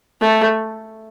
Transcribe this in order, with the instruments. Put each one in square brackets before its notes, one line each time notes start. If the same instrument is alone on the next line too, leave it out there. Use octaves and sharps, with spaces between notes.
[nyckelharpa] A3